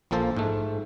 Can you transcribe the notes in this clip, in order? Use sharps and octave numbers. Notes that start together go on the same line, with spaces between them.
A#1 F3 A#3 A4 C5
G#2 A3